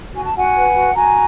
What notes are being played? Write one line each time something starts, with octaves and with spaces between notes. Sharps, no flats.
F#4 G#5
A5
F#4 F#5 G#5
B4
F#4
F#4 G#5 A#5